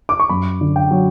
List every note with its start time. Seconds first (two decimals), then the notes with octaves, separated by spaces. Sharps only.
0.09 D6
0.20 C#6
0.29 F#2 B5
0.61 D3
0.76 G5
0.91 F#3